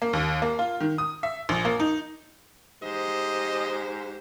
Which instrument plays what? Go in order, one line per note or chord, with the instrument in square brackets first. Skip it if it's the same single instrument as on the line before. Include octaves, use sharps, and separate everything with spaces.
[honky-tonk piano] A#3
D#2
A#3
F4
D#3
D#6
E5
A#1
A#3
D#4
[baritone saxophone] G#2 [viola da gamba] G4 C5 [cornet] D#5